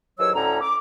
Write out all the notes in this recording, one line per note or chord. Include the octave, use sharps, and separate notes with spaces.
D#2 G#2 E3 F#3 C#5 E6
D2 A2 D3 C#4 A#5
D6